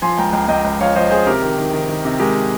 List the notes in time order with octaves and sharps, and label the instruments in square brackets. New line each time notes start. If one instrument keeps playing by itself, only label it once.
[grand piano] F3 G#5 C6
C#2 G5 A#5
C#2 G5 A#5
C#2 D#5 G5
C#2
F3 C#5 F5
F3 C5 D#5
F3 G#4 C5
C3 G4 A#4
D#3
D#3
D#3
D#3
C3
G#3 G4 A#4